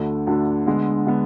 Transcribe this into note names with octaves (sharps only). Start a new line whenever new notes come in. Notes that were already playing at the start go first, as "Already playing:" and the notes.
Already playing: D2 D3 A3 D4
D2 D3 A3 D4
D3 G#3 B3
D3 G#3 B3